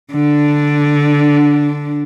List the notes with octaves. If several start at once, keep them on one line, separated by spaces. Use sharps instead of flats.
D3 D4